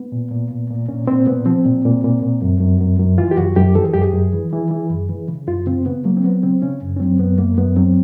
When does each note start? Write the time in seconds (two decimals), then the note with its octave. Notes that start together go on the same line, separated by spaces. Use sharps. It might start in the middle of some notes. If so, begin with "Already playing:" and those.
Already playing: B3
0.12 A#2
0.31 A#2
0.51 A#2
0.70 A#2
0.89 A#2 C#4
1.07 A#2 C4
1.27 A#2 B3
1.46 F3 C4
1.65 A#2
1.85 A#2
2.04 A#2
2.22 A#2
2.42 F#2
2.61 F#2
2.81 F#2
2.99 F#2
3.18 E3 F4
3.31 G4
3.37 F#2 F#4
3.56 F#2 G4
3.75 E3 A4
3.84 G#4
3.94 F#2 G4
4.01 G#4
4.13 F#2
4.33 E3
4.53 E3
4.71 E3
4.90 F#2
5.09 E3
5.28 C#3
5.47 F#2 F4
5.67 C#3 C4
5.86 C#3 B3
6.05 F#3 A#3
6.17 C4
6.24 F#3 B3
6.43 C#3 C4
6.62 C#3 C#4
6.81 F#2
6.96 C#4
7.00 F#3 C4
7.19 F#2 B3
7.39 F#2 A#3
7.58 F#2 B3
7.77 F#3 C4